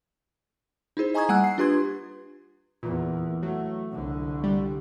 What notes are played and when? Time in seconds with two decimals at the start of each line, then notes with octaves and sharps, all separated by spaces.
0.97 D#4 E4 G#4 C5
1.14 D#5 G#5 A#5 C#6 D#6 G#6
1.29 G3 A#3 F#5 G#5 E6 F#6
1.44 C7
1.58 D4 F4 G4 B4 C6 G#6
2.83 E2 A#2
3.43 F#3 A3
3.93 C2 D3
4.43 G3